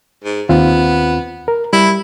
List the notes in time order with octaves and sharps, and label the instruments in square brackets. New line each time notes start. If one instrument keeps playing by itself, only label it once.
[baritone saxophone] G#2
[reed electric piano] D#2 C4 F4 [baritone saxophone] B3
[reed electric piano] A#4
[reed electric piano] G3 [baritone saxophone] E4